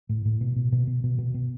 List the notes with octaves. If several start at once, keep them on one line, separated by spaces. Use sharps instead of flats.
A2
A2
B2
B2
B2
B2
B2
B2
B2